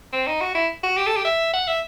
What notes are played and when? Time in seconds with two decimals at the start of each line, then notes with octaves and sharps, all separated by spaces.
0.13 C4
0.27 D#4
0.41 F#4
0.55 E4
0.83 F#4
0.97 G4
1.06 A4
1.16 G4
1.25 E5
1.53 F#5
1.67 E5